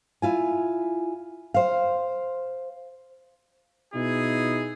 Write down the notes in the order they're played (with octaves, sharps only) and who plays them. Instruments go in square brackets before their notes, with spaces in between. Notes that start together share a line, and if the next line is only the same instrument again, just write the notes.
[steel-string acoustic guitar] E4 F4 G#5
C5 F5
[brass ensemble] B2 D#4 E4 G#4